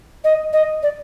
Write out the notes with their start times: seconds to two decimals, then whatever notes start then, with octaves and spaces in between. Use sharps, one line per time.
0.24 D#5
0.53 D#5
0.83 D5